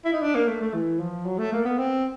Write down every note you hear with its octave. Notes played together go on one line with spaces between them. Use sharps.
E4
D#4
D4
A#3
A3
A3
E3
F3
F#3
A3
A#3
B3
C4